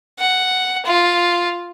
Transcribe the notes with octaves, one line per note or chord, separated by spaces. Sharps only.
F#5
F4